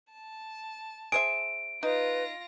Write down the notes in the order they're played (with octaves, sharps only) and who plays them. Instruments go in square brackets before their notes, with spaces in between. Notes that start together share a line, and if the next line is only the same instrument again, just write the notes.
[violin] A5
[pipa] G#4 C5 E5 [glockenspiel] D7
[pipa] D#4 [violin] F4 A#6 [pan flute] B4